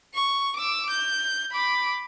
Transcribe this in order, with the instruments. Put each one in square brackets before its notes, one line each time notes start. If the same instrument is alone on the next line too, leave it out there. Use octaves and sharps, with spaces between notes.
[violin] C#6
D6 E6
G6
B5 D6